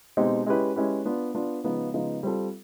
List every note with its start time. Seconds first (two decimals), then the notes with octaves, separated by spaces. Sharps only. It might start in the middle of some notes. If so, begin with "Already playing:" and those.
0.17 B2 G#3 C4 D#4 G4
0.46 G#3 C#4 E4 G4 B4
0.76 G#3 C#4 E4 G4 B4
1.06 B3 D4 F4
1.35 B3 D4 F4
1.64 C#3 F3 G#3 B3 D#4
1.94 C#3 F3 G#3 B3 D#4
2.23 G3 C4 F4 A4